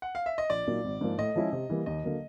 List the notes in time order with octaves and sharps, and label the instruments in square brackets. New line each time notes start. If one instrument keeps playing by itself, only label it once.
[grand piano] F#5
F5
E5
D#5
[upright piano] A#1 [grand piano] D5
[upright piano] A#2 F#3 A#3 D#4
G#1
G#2 F3 A#3
[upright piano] A2 [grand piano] D#5
[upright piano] F3 G#3 C#4 E4
C3
E3 G3 A#3
[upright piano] D#2 [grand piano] D#5
[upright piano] D3 F#3 A#3